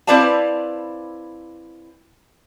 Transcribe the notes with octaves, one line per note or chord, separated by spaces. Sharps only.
C4 E4 B4 D5 F5 A5